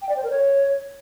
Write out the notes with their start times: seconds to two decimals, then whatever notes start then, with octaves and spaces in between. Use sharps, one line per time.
0.02 G5
0.09 D5
0.16 C5
0.23 A#4
0.31 C#5